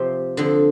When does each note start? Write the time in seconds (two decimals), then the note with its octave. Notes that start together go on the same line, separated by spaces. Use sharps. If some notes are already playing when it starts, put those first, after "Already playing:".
Already playing: C3 F3 C4 G4 C5
0.37 D3 F3 C4